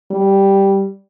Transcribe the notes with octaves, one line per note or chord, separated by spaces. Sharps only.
G3